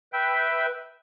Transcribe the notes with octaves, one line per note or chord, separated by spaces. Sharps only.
B4 E5 G5